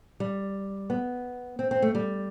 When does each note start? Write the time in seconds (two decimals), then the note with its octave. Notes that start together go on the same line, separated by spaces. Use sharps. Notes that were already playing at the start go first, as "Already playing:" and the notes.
0.20 G3
0.90 B3
1.59 C4
1.71 C4
1.82 A3
1.95 G3